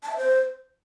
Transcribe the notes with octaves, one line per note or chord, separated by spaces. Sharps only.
A5
E5
C5